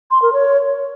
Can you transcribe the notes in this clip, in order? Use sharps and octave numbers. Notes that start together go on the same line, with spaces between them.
C6
A#4
C#5